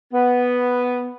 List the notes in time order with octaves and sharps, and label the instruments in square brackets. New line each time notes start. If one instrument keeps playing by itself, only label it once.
[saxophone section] B3